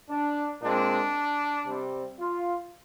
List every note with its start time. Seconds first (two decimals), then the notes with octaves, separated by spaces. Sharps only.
0.09 D4
0.62 A#2 G#3 C4 D4
1.66 C3 G3 C4
2.19 F4